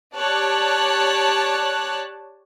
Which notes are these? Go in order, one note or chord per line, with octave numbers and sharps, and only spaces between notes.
G4 C#5 D5 A5 F#6